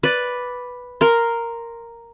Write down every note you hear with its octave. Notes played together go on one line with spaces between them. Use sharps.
B4 D5
A#4 C6